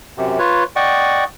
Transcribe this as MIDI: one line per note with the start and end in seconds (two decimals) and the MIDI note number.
0.18 0.39 42
0.18 0.39 48
0.39 0.64 65
0.39 0.64 71
0.39 0.64 73
0.76 1.24 74
0.76 1.24 75
0.76 1.24 78
0.76 1.24 79
0.76 1.24 85